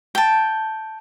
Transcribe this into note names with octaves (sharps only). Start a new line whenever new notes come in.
G5 A5